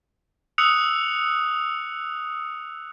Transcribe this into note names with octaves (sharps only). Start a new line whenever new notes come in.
D#6 E6 F#6 C#7 F7